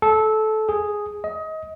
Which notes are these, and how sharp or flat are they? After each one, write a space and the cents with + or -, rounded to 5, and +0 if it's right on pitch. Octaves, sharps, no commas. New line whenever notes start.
A4 -20
G#4 +0
D#5 +25